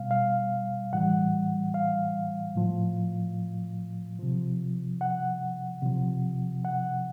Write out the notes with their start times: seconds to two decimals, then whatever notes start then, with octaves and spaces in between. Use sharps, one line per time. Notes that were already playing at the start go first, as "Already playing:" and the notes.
Already playing: B2 G3 F5
0.11 F5
0.93 A2 E3 G3 F#5
1.74 F5
2.56 A2 F3
4.19 C3 F3
5.01 F#5
5.82 C3 F3
6.65 F#5